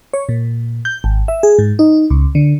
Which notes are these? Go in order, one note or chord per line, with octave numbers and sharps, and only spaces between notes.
C#5
A#2
G6
G#1
E5
G#4
G#2
D#4
C#2
D3